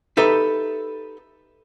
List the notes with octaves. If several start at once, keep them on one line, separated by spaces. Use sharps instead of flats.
D#4 G4 A4 B4 E5